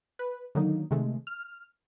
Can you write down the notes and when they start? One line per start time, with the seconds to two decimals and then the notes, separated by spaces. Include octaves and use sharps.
0.19 B4
0.55 D3 D#3 F#3 A#3 D#4
0.91 C3 D#3 G#3 A3
1.27 F6